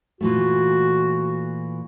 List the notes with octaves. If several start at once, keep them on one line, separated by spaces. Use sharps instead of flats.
A#2 E3 A3 F#4